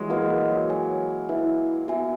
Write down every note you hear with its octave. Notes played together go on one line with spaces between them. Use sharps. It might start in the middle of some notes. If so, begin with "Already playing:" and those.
Already playing: E3 F#3 G#3
A#3 F#4 B4 D#5 F#5
G#3
F#3
F#4 C#5 G#5
E4 B4 E5 G#5
B3 F#4 B4 E5 G#5